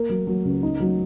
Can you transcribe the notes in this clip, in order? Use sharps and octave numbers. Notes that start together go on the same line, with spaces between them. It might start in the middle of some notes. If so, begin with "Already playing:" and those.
Already playing: A#3
F#3
F#3
C#2
D#4
F#3